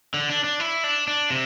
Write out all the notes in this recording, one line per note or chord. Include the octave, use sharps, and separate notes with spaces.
D3
D4
D4
E4
D4
D4
C3